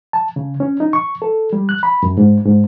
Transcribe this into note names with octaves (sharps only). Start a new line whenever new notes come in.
A5
C#3
C#4
D#4
C#6
A4
G3
F#6
B5
F#2
G#2
G#2